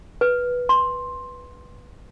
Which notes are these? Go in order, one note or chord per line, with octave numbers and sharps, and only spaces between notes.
B4
C6